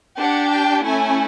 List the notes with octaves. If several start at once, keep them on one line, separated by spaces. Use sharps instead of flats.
D4 G4 F#5
G5
A3 C#4 E4 G#5